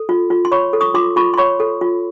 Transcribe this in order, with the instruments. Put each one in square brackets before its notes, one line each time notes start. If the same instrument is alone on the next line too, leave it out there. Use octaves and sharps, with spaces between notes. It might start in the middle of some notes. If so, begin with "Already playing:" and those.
Already playing: [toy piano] A4
F4
F4
C6
C#5 B5 C#6
A4
C#6 D#6
F4 C6 D6
F4 B5 C#6
C6
C#5 B5 C#6
A4
F4